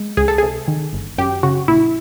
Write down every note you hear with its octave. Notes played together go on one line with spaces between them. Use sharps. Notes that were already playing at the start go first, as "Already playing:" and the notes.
Already playing: G#3
C#2 G#4
A4
C3 G#4
D#3
G1
F#2 G4
C#3 F#4
A#1 E4